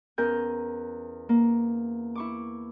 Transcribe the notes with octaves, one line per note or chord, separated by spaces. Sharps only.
E2 C#4 A#4 G#5 G6
A#3
E4 C#6 D6